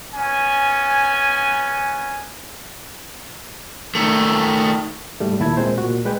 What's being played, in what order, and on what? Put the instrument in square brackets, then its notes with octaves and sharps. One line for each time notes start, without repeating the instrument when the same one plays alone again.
[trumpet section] B3 C#4 G#5
[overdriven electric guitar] D#3 A3
[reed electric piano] G#2 G3 A3
D#2 A#2 E4 A5 B5 G#6
A#2 G#3 C4 C5
A#2 F#4
G#3 B4 D5 G5